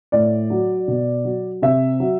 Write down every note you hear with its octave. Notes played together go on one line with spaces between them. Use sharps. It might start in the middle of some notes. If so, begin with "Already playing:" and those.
A2 D5
F#3
B2
F#3
C3 E5
F#3